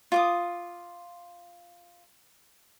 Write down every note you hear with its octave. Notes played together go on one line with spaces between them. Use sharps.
F4 D6 D#6